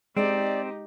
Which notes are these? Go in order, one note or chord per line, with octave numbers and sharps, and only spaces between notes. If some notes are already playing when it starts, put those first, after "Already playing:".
G#3 C4 D#4 G4 D5